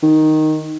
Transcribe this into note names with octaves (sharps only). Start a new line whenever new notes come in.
D#3